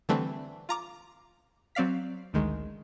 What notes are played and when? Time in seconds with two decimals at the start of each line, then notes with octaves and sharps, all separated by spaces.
0.09 D3 E3 G3 A3 C4 D4
0.69 F4 A#5 D6
1.75 F#3 C4 D5 F5 B6
2.33 A1 D2 D#3 G#3